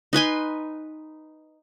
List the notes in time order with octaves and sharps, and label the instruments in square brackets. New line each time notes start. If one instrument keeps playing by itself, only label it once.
[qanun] D#4 B4 G#5 C6